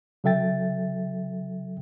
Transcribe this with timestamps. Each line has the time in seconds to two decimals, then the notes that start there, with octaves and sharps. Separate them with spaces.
0.24 C#3 F#3 A4 E5 G5 A6